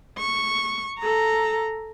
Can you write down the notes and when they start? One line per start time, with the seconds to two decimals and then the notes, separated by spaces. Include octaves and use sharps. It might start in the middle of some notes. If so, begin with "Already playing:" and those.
0.18 C#6
0.99 A4 A#5